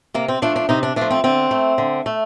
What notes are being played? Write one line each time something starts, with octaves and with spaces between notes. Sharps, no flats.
C3 A#3
C4
F3 A3 D4
D4
C3 D#4
D4
F3 A3 D4
C4
D3 C4
A3
D3
A3